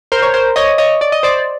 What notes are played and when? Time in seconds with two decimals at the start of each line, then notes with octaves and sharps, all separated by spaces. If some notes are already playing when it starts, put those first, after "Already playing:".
0.12 A#4 C5
0.22 C#5
0.34 A#4 C5
0.56 C#5 D#5
0.78 C#5 D#5
1.01 D5
1.12 D#5
1.23 C5 D5